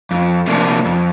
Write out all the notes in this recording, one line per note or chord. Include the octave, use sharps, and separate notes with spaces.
F2
C3 F3 A#3 D4
F2